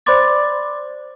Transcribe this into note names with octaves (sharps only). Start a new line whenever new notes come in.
C5 D5 B5 C6 D6 A6